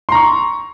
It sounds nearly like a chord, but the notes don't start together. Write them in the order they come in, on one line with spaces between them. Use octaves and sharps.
C6 A#5 C#6